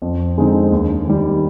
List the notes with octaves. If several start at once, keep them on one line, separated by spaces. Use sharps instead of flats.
F2
D3 G#3 C4 D#4
D#2
D#3 G3